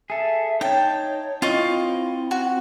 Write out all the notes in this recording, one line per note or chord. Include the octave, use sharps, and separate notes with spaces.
G#4 A4 E5
D#4 C#5 G5 A5
C4 E4 F4 D#5 C#6
F#4